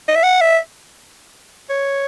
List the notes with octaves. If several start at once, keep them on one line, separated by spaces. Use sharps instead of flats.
D#5
E5
F#5
E5
C#5